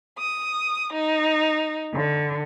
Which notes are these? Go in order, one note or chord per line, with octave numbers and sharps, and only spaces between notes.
D#6
D#4
D3